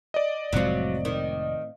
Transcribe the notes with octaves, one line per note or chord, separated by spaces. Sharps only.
D5 D#5
F1 A2 F#3 G#3 C4 F4
D#3